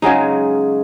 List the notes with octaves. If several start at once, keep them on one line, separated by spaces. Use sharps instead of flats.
C#3 F#3 G#3 D#4